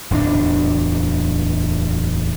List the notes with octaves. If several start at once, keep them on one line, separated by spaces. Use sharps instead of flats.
D1 E2 C4 D4